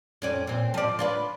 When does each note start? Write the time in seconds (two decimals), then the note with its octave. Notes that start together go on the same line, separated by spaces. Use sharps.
0.22 F2 C#4 D5
0.47 A#2 C4
0.74 F3 D5
0.99 D4 F4 B4